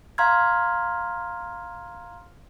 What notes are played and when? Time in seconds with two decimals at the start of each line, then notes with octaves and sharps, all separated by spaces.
0.18 F5 A#5 C6 F6 G#6